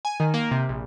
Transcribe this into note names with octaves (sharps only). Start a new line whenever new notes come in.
G#5
D#3
A#3
C3
A#1